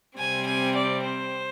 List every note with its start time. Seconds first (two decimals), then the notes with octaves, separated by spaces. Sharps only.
0.18 C3 G3 C4 G#5
0.47 G#5
0.76 D5
1.04 C5